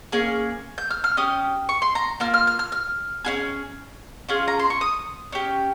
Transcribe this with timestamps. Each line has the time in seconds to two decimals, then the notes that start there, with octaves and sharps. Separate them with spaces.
0.12 A#3 C#4 G#4
0.78 G6
0.91 F6
1.04 F6
1.17 C#4 G4 D#6
1.69 C#6
1.82 C6
1.95 A#5
2.20 A#3 F4 F6
2.34 F6
2.47 F6
2.59 F6
2.72 F6
3.25 C#4 F4 G#4
4.29 C#4 F4 G#4
4.48 A#5
4.60 C6
4.70 C#6
4.81 D#6
5.32 C#4 G4